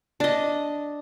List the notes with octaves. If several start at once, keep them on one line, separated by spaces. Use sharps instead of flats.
D4 D#5